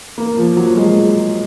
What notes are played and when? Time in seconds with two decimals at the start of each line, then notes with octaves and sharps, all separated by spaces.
0.18 A#3
0.37 F3
0.57 F#3
0.77 G#3